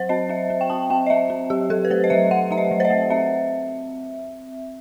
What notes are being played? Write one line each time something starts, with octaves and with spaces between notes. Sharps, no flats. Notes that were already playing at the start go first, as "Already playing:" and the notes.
Already playing: F#3 C5
C4 D#5
C4 E5
C4
G5
C4 A5
C4 G5
D#5
C4 E5
C4
F#3 G4
F#3 A4
B4
A3 C5
D#5
F#3 E5
F#3 F#5
A3 E5
D#5
F#3
C5
D#5
A3
C4 E5